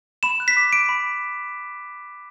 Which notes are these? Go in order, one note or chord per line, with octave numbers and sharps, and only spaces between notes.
B5 E7
F#6
B6
D6
D6 D7
B5